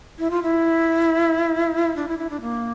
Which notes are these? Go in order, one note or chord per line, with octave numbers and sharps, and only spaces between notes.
E4
F4
E4
D4
E4
E4
D4
A#3